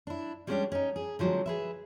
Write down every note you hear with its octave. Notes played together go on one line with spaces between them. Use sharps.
D4 E4
G3 G#3 B3 C#4 D4 G4
C#4 D#4
G#4
D3 F3 F#3 G#3 C4
G#4 B4 E5